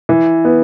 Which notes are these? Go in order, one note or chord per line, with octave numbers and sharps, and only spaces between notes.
E3
B3